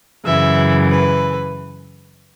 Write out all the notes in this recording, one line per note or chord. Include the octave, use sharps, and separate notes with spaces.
F#2 C#3 E3 E5
B4